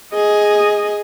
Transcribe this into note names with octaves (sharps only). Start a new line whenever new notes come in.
G#4 D#5